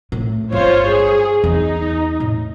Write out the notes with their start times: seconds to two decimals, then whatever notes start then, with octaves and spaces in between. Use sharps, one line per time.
0.12 A2
0.52 G1 E4 F4 C5 C#5
0.87 G#4
1.44 E2 D#4
2.20 A2